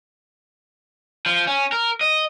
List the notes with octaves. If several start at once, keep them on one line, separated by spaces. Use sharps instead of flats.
F3
C#4
A#4
D#5